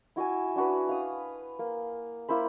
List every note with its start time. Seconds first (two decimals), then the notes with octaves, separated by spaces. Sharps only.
0.16 E4 F#4 E5 G#5
0.56 D4 F#4 B4
0.89 F5 D#6
1.59 A#3
2.28 A#3 E4 C5 B5